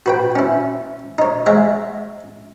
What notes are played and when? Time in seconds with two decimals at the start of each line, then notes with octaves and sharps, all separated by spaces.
0.06 F#4 B4 G5
0.36 C#4 E4
1.18 D#4 C#5
1.46 G#3 C#5 E5 F#5